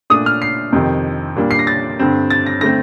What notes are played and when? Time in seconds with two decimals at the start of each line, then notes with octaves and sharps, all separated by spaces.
0.10 A#2 A3 D4 D#6
0.26 F6
0.42 C7
0.72 F2 C3 D#3
1.36 A#2 G3 A#3 D4
1.51 C7
1.59 A#6
1.67 A6
1.99 G2 D3 G3 C4
2.30 A6
2.46 A#6
2.61 D3 A3 C4 A#6